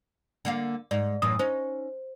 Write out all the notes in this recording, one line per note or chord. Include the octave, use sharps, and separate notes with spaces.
D3 A#3 F5
G#2 D5
F#2 A2 E3 D#6
C#4 D#4 C5